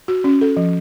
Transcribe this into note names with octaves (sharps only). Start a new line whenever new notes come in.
F#4
C#4
A4
F3